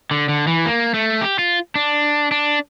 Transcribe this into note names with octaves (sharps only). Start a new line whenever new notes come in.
D3
D3
E3
A#3
A3
G4
F4
D4
D4